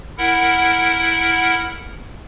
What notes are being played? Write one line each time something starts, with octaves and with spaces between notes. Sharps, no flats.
E4 A#4 F#5